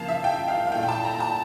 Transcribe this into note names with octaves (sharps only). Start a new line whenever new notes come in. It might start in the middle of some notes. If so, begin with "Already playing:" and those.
Already playing: C#3 F3 A#3 F5 A5
E5
G5
F5
F5
A#2 A3 E4 G5
G5
A5
A#5
A5